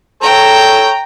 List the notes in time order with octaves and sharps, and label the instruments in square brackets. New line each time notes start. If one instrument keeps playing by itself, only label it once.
[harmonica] A4 C#5 [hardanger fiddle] G5 A#5